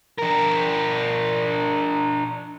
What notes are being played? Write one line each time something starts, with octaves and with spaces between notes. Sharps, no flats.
D4 A#4